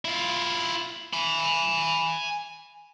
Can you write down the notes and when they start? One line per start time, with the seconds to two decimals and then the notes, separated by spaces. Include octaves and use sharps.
0.05 E4 F4
1.13 G#5 B5